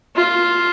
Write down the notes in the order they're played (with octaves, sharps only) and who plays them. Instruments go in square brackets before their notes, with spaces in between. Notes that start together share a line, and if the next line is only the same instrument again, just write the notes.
[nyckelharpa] F4